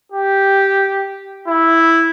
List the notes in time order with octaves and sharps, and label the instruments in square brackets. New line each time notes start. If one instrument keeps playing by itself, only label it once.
[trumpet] G4
E4